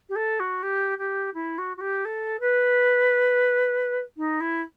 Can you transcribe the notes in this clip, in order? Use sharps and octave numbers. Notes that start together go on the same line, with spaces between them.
G4
A4
F#4
G4
G4
E4
F#4
F#4
G4
A4
B4
D#4
E4